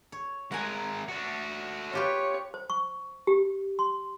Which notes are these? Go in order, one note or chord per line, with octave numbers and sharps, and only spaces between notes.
C#5
G#3 A#4 F#5 G#5
D4 F#4
F4 G4 B4 C#5
C5
C#6
G4
C6